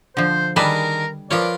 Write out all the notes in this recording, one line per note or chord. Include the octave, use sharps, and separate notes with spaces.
D3 F3 C5
D#3 G3 D4 G#4 A#4 B4 A5
F3 F4 A#4 B4 C#5 D5